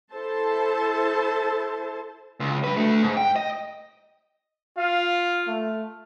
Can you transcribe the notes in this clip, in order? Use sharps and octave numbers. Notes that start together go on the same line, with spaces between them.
E4 A4 C5 A5
C#2
G3 B4
D3 A3
G#2
G5
D#5
F4 F5
A3